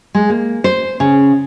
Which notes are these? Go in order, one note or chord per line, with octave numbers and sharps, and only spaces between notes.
G#3
A#3
C5
C#3